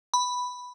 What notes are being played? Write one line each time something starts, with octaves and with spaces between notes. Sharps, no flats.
B5